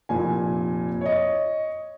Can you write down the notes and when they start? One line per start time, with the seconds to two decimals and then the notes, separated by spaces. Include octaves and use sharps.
0.09 F1 A#2 G#5
1.01 C#5 D#5